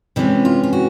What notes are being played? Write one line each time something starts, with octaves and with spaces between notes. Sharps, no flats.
C3 E3 G#3 C#4 D#4
F4
F4
F#4